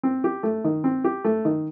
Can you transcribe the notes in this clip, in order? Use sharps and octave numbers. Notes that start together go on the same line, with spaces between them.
C4
G4
A3
D#3
C4
G4
A3
D#3